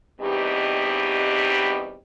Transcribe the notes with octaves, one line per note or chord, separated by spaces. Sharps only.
E2 B2 G3 C4 D#4 G4